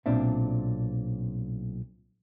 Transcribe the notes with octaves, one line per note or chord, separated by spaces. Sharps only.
B1 A#2 C4 D4 E5